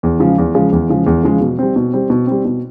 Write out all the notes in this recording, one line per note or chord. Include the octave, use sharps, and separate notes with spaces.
E2
C#3 F3 G#3
E2
C#3 F3 G#3
E2
C#3 F3 G#3
E2
C#3 F3 G#3
B2
G3 C4
B2
G3 C4
B2
G3 C4
B2